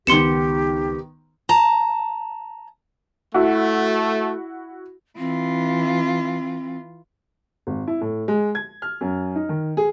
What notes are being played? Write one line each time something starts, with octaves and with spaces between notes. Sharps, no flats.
C#2 D#3 B3 G4 C6 C#7 E7
A5 A#5
A3 E4 F#4
E3 C4 F4
G#1
E4
A2
G#3
G#6
F6
F#2
D#4
D#3
G#4